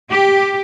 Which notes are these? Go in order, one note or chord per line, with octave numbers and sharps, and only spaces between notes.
G4